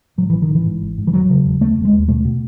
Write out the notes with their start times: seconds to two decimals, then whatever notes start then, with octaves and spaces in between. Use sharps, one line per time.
0.18 A2 F#3
0.30 A1 E3
0.42 D#3
0.49 A1
0.55 E3
0.66 G#2
0.81 G#1
0.98 G#2
1.07 E3
1.14 E1 F#3
1.29 C#3
1.45 E1
1.61 D#2 A3
1.77 E1
1.85 G#3
1.92 D#2
2.08 B2 A3
2.25 B2